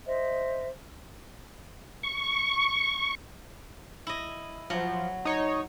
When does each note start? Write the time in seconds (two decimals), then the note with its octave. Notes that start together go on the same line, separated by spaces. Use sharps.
0.06 C5 D#5 E5
2.03 C#6
4.07 E4 D#5
4.70 F3 F#3
5.25 D#4 C#5